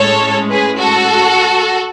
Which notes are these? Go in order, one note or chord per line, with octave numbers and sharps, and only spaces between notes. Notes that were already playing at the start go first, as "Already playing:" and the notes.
Already playing: A2 G#3 C#4 A4 C#5
G#4 B4
F#4 A4